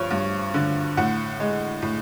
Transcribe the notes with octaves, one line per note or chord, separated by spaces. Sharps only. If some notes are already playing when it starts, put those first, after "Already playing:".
Already playing: G2 F3 C#5
G2
D3
A2 F#5
G#3
A2